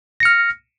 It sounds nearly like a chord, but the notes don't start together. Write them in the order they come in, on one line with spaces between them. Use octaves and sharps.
A#6 C#7 F6